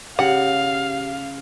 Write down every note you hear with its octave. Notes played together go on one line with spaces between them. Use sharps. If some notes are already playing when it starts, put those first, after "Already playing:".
C#3 G4 F5 F#5